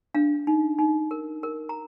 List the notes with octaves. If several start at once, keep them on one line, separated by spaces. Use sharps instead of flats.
D4 F5
D#4
D#4
A#4
A#4
A#5